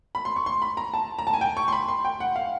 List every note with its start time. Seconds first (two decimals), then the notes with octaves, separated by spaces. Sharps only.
0.15 B5
0.25 C6
0.36 C#6
0.46 C6
0.62 B5
0.77 A#5
0.94 A5
1.19 A#5
1.27 A5
1.34 G#5
1.41 G5
1.57 C#6
1.68 C6
1.72 B5
1.88 C6
2.05 G5
2.20 F#5
2.36 F5